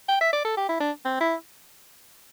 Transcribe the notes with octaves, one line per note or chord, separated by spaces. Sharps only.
G5
E5
D5
A4
G4
E4
D4
C4
E4